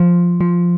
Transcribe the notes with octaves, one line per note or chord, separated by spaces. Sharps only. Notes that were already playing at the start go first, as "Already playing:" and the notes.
Already playing: F3
F3